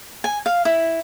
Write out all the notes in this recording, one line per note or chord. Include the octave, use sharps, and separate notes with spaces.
G#5
F5
E4